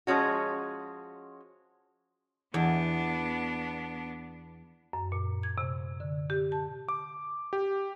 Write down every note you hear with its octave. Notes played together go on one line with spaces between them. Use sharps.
F3 G#3 C#4 F#4
E2 B3 D4
F#2
A#2
G#6
C3
D3
G4
A5
D6
G4